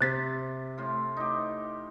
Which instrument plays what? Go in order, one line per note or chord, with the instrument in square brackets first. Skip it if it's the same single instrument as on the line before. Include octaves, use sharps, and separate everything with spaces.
[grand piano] C3 C4 [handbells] F#6 A6 B6
[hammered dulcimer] A2 F4
D#4 G4